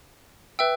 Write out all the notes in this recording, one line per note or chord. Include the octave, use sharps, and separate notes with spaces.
B4 E5 G5 E6